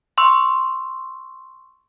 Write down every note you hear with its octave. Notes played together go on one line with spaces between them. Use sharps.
C6 C#6 E6